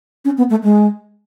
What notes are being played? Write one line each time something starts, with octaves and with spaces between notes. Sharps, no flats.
C#4
B3
A3
G#3